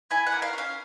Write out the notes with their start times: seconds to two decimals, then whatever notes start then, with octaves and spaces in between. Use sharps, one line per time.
0.11 E4 G#5
0.27 F#5
0.32 A#3
0.42 F5
0.53 C#4 F5